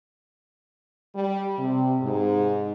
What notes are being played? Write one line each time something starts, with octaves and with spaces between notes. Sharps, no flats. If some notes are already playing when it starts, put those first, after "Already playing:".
G3
C3
G#2